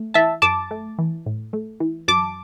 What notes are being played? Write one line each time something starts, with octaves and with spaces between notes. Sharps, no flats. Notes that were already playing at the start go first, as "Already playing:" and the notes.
Already playing: A3
E3 E5 A5
F#2 A5 D6
A3
E3
A2
A3
E3
F#2 A5 D6